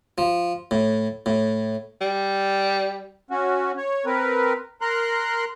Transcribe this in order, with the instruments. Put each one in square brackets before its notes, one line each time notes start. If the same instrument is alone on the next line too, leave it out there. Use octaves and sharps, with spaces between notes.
[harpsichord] F3
A2
A2
[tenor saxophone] G3
[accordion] C#4 F#4
C#5
C4 A#4 B4
A#4 A#5 C6 F#6